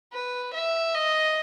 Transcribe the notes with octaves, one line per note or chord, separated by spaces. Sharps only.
B4
E5
D#5